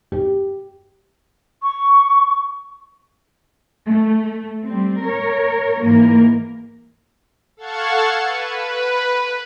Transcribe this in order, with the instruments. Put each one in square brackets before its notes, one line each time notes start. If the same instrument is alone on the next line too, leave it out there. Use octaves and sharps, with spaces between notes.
[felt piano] G4
[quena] C#6
[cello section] A3
G3 C4
A#4 C#5
G#2 E3 A#3 A#4
[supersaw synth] A4 F5 F#5 A5 C#6 G#6
B4